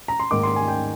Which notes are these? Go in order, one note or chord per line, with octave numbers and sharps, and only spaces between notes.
A#5
C6
G#2 D#3 A#3 D6
C6
G#5
G5